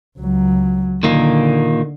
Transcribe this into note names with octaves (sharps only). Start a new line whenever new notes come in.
C#2 F#3
A#2 D3 D#3 A#3